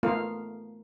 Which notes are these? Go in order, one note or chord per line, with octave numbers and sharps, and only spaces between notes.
A3 B3 F4 A#4 F5